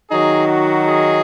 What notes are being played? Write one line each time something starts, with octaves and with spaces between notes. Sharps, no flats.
D#3 F#3 D#4 G#4
F#4
G#4